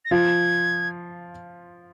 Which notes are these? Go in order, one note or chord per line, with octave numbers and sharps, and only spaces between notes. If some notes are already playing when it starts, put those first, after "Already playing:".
A#6
F3 F4 G#6